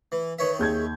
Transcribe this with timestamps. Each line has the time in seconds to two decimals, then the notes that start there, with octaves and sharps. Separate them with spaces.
0.12 E3
0.39 D#3 B4 C#5 E5
0.59 D#2 G#4 G6 G#6